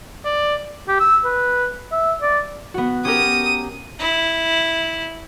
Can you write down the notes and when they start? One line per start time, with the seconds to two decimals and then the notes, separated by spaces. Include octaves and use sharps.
0.24 D5
0.88 G4
1.00 E6
1.25 B4
1.92 E5
2.22 D5
2.74 B3 F#4
3.05 C#4 G4 A#4 D#6
3.99 E4